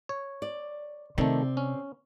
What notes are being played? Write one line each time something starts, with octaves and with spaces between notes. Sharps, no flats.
C#5
D5
C3 D#3 A3 C4 D5
C#4